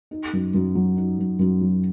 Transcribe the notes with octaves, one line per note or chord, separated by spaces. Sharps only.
D#4
F#2
F#2
F#3
D#4
F#2
F#2
F#3